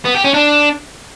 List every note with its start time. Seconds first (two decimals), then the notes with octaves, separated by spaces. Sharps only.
0.05 B3
0.15 G4
0.24 C#4
0.34 D4